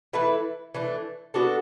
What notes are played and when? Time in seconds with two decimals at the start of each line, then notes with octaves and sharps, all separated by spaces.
0.13 E3 A3 E4 B4
0.75 E3 A3 D4
1.34 B3 D4 F#4 A4